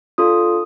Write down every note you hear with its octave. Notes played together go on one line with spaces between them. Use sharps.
D4 F4 A4 D#6